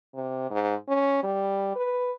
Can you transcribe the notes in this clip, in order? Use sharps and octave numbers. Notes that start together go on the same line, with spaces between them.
C3
G#2
C#4
G3
B4